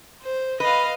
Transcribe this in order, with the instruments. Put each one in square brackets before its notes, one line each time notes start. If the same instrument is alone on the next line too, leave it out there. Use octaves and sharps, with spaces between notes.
[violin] C5
[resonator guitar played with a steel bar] B4 [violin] D#5 F5